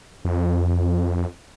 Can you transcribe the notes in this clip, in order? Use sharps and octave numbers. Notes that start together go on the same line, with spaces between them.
F2